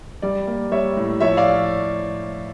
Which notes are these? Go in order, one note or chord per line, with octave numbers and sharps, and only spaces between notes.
G3 D5
A#3
G3 C#5 E5
A2
F3 C#5 E5
D5 F5